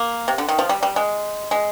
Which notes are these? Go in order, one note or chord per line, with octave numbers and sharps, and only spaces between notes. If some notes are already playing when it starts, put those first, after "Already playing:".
Already playing: A#3
C3
D3
D#3
F3
G3
G3
G#3
G#3